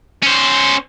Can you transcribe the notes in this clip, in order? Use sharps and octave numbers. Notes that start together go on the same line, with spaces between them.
C#4 C5